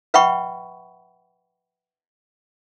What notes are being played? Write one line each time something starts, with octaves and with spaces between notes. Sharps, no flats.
B4 E5 F#5 G5 B5 C#6